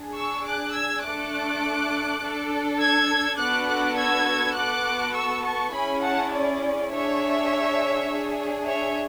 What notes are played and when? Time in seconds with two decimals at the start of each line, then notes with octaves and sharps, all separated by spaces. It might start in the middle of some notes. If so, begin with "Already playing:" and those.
Already playing: D4 G#4
0.16 C#6 E6
0.45 D6 F#6
0.74 E6 G#6
1.04 A3 D4 A4 D6 F#6
2.22 D4 A4
2.80 E6 G#6
3.38 B3 D4 F#4 A4 D6 F#6
3.67 D6 F#6
3.96 E6 G#6
4.56 B3 F#4 A4 D6 F#6
5.14 C#6 E6
5.44 A5 C#6
5.73 C#4 E4 G#4 G#5 B5
6.02 F#5 A5
6.32 D5
6.90 D4 G#4 C#5 E5
8.08 D4 G#4
8.66 C#5 E5